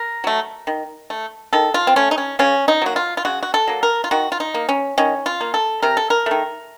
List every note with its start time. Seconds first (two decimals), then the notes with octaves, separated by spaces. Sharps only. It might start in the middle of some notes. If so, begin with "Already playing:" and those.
Already playing: A#4
0.24 F#3 A3
0.67 D#3
1.10 A3
1.53 D#3 A4
1.74 F4
1.87 C4
1.96 A3 C#4
2.11 D#4
2.18 C#4
2.39 C#3 C#4
2.68 D#4
2.82 F#3 A#3 F#4
2.96 F4
3.17 F4
3.25 C#3 F#4
3.43 F#4
3.54 A4
3.67 F#3 A#3
3.83 A#4
4.04 F4
4.11 D#3 F#4
4.32 F4
4.40 D#4
4.54 A#3
4.69 C#4
4.98 D#3 C#4
5.26 F4
5.41 A#3
5.54 A4
5.83 C3 A#4
5.97 A4
6.10 A#4
6.26 D#3 A3